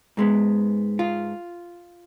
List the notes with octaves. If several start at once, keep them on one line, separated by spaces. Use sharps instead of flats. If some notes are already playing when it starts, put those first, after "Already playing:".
G#2 G#3 B3
F4